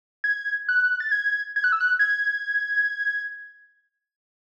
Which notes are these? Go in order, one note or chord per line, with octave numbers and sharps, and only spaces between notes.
G#6
F#6
A6
G#6
G#6
F#6
E6
F#6
G#6